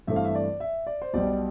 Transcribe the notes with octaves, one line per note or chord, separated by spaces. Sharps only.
G2 E3 A3 C4 E5
F5
E5
D5
E5
D5
C5
B1 B2 G3 D5